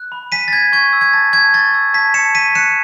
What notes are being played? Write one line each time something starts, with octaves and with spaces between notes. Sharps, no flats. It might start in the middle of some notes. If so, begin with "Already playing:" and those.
Already playing: F#6
B5
G#5 B6 D#7
A6
G#5 G#6
C#6 G#6
E6
G#6
A5 A6
A5 G#6
C#6 A6
E6
A5 G#6 B6
A5 C#7 E7
C#6 B6 D#7
F#6 C#7 E7